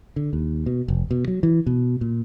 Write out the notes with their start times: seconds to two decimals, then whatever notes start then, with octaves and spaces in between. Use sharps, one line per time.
0.16 D3
0.33 D#2
0.66 B2
0.88 F1
1.11 B2
1.28 F#3
1.43 E3
1.67 B2
2.01 A#2